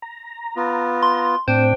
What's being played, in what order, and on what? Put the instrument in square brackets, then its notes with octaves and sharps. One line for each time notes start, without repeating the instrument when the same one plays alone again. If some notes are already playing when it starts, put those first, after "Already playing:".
[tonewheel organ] A#5
[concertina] B3 F4
[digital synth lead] C6
[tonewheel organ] A2 C4 [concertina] D4 G5 [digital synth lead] C5